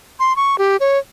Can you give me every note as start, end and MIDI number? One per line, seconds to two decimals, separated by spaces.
0.20 0.36 84
0.36 0.58 85
0.58 0.77 67
0.80 0.99 73